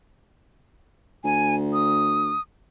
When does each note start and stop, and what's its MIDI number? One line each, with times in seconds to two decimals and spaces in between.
1.24 2.34 38
1.24 1.55 80
1.73 2.41 87